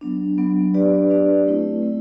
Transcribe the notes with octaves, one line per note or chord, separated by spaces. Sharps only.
F#3 B3 D4
F#3 B3 D4
D4 G4 B4 D5
D4 G4 B4 D5
A3 C4 E4
A3 C4 E4